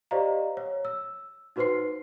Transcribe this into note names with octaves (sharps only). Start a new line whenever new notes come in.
G4 C5 D5 D#5 F5 A#5
C#5
E6
D#4 F#4 B4 C5 C6 C7